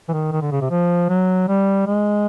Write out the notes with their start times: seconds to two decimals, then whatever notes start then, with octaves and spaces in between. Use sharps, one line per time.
0.09 E3
0.13 D#3
0.32 D#3
0.42 D3
0.51 C#3
0.61 C3
0.71 F3
1.09 F#3
1.49 G3
1.87 G#3